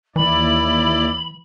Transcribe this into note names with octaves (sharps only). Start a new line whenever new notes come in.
D#2 E3 E4 D5 B5